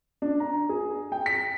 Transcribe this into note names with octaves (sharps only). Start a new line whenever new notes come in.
D4
A#5
G#4
G5
B6